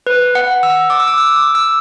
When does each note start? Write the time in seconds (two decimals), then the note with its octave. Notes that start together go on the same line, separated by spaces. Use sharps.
0.07 B4
0.35 F#5
0.63 E6
0.90 D6
1.00 E6
1.08 D6
1.18 E6
1.36 D6
1.55 E6